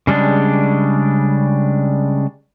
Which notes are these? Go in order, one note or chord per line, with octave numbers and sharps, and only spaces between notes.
C#3 G3 G#3 D4